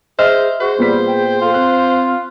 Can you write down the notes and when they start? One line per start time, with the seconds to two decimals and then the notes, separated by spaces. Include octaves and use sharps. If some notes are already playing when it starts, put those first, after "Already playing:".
0.19 G#4 C5 D#5 E5 F6
0.61 F#4 G#4 C5
0.79 A#2 G3 B3 B6
1.08 G5
1.41 F4 A4
1.54 C4 F#6